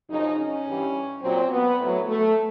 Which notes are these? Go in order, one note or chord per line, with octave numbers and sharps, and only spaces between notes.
F#2 C#3 F3 D#4
C#4
G2 E3 G3
A#2 F#3 C4
B3
A2 F#3
A3